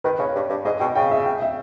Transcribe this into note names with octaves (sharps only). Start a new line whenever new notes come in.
D#3 B4
C#3 C#5
G2
G2
G#2 D#5
B2 G5
C#3 G5
E5
G5
E5